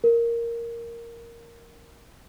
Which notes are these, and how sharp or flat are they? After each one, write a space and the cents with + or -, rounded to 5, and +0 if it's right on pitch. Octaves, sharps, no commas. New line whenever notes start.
A#4 +0